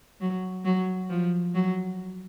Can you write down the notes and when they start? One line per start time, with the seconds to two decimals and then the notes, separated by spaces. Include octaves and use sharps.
0.21 F#3
0.65 F#3
1.09 F3
1.54 F#3